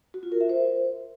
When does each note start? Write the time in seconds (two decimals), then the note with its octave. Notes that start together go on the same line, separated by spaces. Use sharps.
0.14 F#4
0.23 F4
0.32 A#4
0.41 E5
0.49 C5